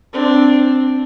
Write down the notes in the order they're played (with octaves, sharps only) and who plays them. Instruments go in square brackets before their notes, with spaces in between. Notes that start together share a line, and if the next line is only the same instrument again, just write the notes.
[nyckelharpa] C4 D4